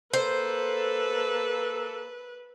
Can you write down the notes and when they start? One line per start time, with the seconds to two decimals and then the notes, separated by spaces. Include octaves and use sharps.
0.13 A#3 A4 B4 C5